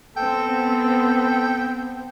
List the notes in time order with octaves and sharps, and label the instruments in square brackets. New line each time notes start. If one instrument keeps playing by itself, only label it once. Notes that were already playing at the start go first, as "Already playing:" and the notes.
[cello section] B3 C4 [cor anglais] A4 [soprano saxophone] G5